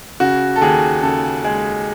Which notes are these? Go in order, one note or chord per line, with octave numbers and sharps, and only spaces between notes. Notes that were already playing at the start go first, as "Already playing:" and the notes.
C#3 F#4
A4
D#2 G#4
C#3 A4
G#3 G#4